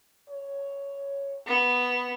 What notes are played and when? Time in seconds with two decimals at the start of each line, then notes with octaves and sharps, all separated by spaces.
0.30 C#5
1.46 B3